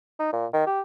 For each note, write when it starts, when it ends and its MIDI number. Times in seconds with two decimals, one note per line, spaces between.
0.20 0.33 63
0.33 0.46 46
0.53 0.66 51
0.66 0.81 67